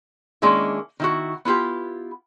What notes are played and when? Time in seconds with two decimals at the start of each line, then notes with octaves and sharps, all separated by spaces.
0.42 D#3 G#3 A#3 C#4 D4 E4
1.00 D#3 E4 F#4
1.45 B3 E4 F4 G4